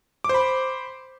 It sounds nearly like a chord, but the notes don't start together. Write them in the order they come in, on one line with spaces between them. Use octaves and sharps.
D6 C5 B5